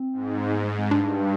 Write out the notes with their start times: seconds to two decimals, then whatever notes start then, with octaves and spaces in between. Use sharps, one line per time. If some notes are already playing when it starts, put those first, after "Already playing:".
Already playing: C4
0.13 G#2
0.52 B3
0.65 G#3
0.78 C4
0.91 G2 D4